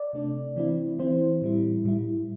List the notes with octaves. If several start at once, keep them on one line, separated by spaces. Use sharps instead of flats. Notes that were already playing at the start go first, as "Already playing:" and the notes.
Already playing: D5
C3 A3 D4
E3 C4 E4
E3 C4 E4 C5
A2 G3 E4
A2 G3 E4